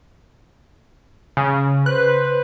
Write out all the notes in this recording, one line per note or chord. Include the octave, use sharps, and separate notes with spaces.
C#3
B4 C5 F#6